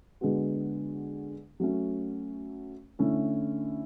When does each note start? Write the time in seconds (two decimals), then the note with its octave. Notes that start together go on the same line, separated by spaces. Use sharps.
0.21 D3 G#3 B3 F#4
1.60 F#3 A3 C#4
2.99 D3 A3 C#4 E4